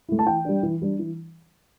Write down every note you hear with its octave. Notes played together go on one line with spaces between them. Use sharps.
A3 E4
A5
E3 G5
G3 D4
E3
G3 D4
E3